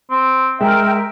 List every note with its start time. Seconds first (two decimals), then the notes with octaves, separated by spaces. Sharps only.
0.10 C4
0.61 G#3 A#4 E5 G5